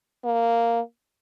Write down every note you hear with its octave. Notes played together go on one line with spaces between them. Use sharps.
A#3